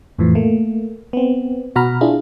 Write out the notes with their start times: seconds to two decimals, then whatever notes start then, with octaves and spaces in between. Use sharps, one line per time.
0.18 F2 A2 E3 F3
0.35 A3 A#3
1.13 B3 C4
1.76 B2 F#4 A#5 B5 F6
2.01 D4 E4 F4 G#4